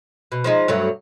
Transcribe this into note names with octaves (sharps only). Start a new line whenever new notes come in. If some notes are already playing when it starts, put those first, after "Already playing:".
B2
F3 G#3 D#4
G2 F#3 A3